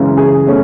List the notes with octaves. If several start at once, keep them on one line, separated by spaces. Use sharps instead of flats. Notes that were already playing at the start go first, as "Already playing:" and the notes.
Already playing: F#2 C#3 E3 G#3
G#4
B2 A3 C#4